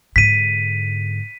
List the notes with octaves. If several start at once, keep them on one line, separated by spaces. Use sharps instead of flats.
G#2 D3 B6 D#7